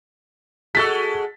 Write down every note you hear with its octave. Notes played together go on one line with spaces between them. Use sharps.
G#3 F#4 A4 E6 A6 B6